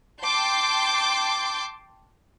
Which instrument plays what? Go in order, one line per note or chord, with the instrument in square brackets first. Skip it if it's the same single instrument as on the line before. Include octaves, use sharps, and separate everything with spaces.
[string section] G5 A5 C6 D6 G6